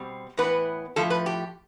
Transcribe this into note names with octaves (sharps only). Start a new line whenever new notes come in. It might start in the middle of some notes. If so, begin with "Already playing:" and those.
Already playing: B2 G3 C4
A2 E3 B3 B4
A2 F3 A3 A4
B4
G4